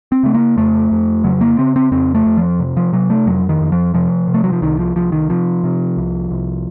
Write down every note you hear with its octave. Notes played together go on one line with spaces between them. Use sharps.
C4
C#3 A3
A#3
F2 A3
F2
C#3 F#3
A#3
C#3 C4
C4
F2 C4
A3
F2
F3
C3
F3
C3 F#3
A3
F2 F#3
D#3
F2
F3
C3 F3
C3
A3
F#3
F3
C2 D#3
F3
C2 F3
D#3
C3 F3
C3
C2
C2